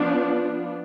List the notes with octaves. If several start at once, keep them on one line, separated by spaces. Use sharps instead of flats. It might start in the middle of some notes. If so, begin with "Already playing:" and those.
Already playing: F3 B3 D4